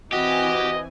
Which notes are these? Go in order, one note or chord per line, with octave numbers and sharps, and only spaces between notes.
E3 C4 F#4 G4 D#5 G#5